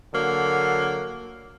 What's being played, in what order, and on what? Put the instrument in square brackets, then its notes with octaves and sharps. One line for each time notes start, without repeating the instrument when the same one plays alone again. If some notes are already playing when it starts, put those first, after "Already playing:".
[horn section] D3 F#3 A#3